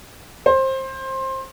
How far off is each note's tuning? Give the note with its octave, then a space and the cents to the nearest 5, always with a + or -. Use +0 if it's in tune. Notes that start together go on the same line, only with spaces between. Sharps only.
C5 +20